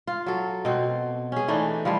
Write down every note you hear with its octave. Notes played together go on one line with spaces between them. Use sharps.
F4
F#3 A4
B2 C4
C#4 G#4
E3 A3 D4 D#4
F3 G3 A3 E4